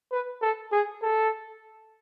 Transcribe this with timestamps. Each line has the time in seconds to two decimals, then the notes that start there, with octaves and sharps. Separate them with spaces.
0.12 B4
0.42 A4
0.72 G#4
1.02 A4